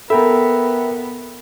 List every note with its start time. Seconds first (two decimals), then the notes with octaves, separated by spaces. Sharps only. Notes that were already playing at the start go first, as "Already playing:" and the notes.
0.10 B3 A4 A#4 E5 G5 A#5 B5